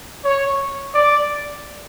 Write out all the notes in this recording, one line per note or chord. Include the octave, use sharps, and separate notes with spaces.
C#5
D5